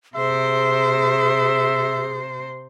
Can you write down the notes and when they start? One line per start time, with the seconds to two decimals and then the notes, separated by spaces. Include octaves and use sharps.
0.16 C3 G#4 C5 E5